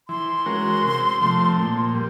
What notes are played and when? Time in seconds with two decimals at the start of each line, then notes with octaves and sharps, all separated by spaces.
0.08 E3 C6
0.46 G#3 C#4 F#4 A#4
0.83 C3
1.21 F3 A3 C4
1.58 A#2
1.95 G3